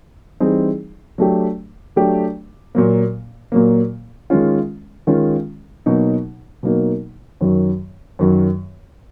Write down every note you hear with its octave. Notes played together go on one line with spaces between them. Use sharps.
E3 G3 C4 D#4 G#4
F#3 A3 D4 G4
F#3 A3 D4 G4
A#2 F#3 A#3
A#2 F#3 A#3
D#3 G#3 C#4 F4
D#3 G#3 C#4 F4
B2 F#3 A#3 D#4
B2 F#3 A#3 D#4
F#2 D#3 F#3
F#2 D#3 F#3